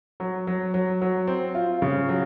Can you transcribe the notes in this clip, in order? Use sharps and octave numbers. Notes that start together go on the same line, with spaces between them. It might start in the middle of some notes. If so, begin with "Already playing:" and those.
F#3
F#3
F#3
F#3
C4
F4
C#3
F#3